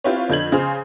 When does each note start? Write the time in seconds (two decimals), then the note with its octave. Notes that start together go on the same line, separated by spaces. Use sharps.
0.04 C4 E4 F4 G4 B4 C#5
0.29 F2 D3 G6 G#6 F#7
0.52 C#3 G#4 C5 F6